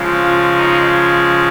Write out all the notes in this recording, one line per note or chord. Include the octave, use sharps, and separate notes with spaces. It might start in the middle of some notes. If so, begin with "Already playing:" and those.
Already playing: C#3 F3 G#3
F4
D#4